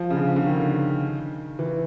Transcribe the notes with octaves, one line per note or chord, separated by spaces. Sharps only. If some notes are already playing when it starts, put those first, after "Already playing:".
Already playing: F3
C#3
D3
D3
D#3
E3